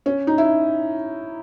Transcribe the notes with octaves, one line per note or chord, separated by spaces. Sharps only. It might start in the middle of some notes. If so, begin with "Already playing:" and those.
C#4
D#4
E4